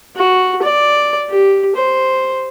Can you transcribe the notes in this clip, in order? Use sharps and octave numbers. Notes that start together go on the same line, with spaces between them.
F#4
D5
G4
C5